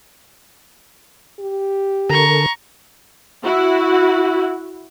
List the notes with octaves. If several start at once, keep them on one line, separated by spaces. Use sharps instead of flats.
G4
D3 A4 A#4 A#5 C#6
E4 F#4